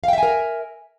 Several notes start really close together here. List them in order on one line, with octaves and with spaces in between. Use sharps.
F5 G5 E5 G#5 A#4